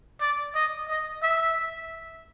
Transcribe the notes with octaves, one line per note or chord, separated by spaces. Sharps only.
D5
D#5
D#5
E5